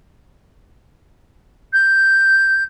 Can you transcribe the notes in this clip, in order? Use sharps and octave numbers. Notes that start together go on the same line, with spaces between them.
G6